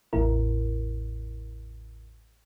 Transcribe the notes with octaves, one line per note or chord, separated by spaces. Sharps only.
A1 E2 A2 E4 A#4